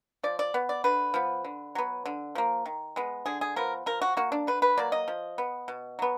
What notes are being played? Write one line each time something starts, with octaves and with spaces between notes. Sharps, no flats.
F3 D5
D5
B3
D5
D3 B4
F3 B3
D3
F#3 B3
D3
F3 A#3
D#3
G#3 B3
D3 G#4
G#4
F3 B3 A#4
F3 A#4
F#4
A#3 F#4
D4
D3 B4
B4
F#3 A#3 D5
D#5
F3
B3
B2
F#3 B3